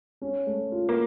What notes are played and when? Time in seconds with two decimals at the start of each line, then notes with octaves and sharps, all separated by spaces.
0.21 C#4
0.47 A3
0.72 F4
0.89 A#3